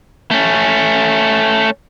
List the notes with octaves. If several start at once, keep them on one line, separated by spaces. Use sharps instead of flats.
A3 C#4